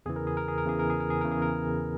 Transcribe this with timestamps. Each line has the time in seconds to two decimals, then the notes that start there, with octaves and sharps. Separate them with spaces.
0.06 E2 C#3 E3 G#4
0.16 A#4
0.27 G#4
0.37 A#4
0.48 G#4
0.58 A#4
0.65 E2 C#3 E3 G#4
0.79 A#4
0.90 G#4
1.00 A#4
1.10 G#4
1.21 E2 C#3 E3 A#4
1.31 G#4
1.42 A#4